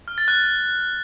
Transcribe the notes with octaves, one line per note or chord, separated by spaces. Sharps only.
F6
A6
F#6